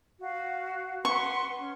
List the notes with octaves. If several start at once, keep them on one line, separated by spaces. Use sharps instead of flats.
F#4 F5
B4 F#5 C6 C#6
C#4